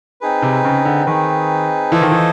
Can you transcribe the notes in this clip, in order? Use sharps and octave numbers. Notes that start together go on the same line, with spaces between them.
C4 D#4 G#4 B4
C3
C#3
D3
D#3 C4 D#4 G#4 B4
E3 F4 A4 C5 D#5
D#3
E3